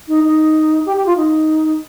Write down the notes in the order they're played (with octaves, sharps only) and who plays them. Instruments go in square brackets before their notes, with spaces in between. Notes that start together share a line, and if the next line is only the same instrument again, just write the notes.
[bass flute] D#4
D#4
G4
G4
F4
D#4